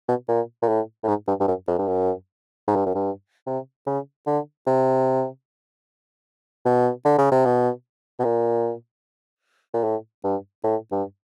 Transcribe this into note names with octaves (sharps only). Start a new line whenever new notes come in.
B2
A#2
A#2
A2
A2
G#2
G2
G2
F#2
F2
G2
F#2
G#2
G2
F#2
G2
C3
C#3
D3
C3
B2
D3
C#3
C3
B2
B2
A#2
A#2
A2
G2
A2
G2